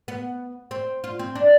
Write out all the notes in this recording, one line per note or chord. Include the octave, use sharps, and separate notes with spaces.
B3
C4
F4
C4
D4